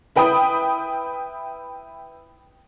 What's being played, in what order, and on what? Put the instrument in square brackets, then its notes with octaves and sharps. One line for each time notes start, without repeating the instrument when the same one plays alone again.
[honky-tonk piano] E4 B4 G5 B5 D#6